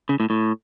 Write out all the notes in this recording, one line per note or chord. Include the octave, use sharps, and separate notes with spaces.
C#3
A2
A2